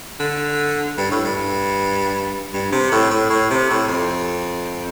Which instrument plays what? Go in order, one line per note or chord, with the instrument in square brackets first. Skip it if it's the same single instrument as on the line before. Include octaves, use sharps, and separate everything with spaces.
[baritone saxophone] D3
G2
A2
G2
G2
C3
A2
A2
A2
C3
A2
F2